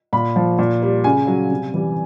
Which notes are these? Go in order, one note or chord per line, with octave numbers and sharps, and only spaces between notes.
A#2 B5
F3
A#2
G3
C#3 G#5
F#3
C3
E3 G3